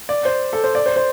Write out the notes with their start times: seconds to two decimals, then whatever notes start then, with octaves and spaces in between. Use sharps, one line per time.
0.09 D5
0.25 C5
0.53 A4
0.64 C5
0.75 D5
0.86 C5
0.96 C5